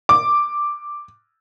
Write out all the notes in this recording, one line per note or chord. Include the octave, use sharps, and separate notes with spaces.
D6